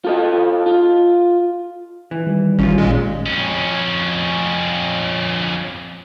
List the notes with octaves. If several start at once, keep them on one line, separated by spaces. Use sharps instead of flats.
F4 A4 D#5
F4
E3
D#3 G3
A1 C#4 F4
A#2 G#3
F2 C#4